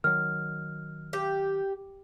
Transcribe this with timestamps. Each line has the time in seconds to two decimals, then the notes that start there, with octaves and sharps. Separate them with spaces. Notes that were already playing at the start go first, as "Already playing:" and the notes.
0.04 D#3 F#3 F6
1.13 G4